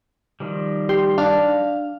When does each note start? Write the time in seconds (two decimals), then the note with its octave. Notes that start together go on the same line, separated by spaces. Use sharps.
0.40 D#3 F3 G3
0.89 G4 C6
1.18 D4 F5